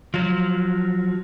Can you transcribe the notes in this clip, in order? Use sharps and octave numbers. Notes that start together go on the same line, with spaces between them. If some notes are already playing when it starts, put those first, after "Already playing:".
F3 F#3